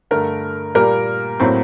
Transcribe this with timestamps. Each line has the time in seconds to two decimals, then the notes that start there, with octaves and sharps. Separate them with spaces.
0.11 G2 D3 A3 A#4
0.75 A#2 G3 A#3 A#4
1.40 A2 F#3 A#3 C4